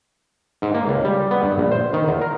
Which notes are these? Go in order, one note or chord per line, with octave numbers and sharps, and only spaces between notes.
G#2
A#3
C#2
G3
B3
G2
A#1
C5
D#3
E2
A#4